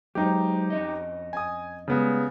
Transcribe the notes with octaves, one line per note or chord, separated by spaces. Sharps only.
F#3 G#3 D#4 G4 C5
F2 C#4 D#5
G#5 D#6
C#3 G3 G#3 B3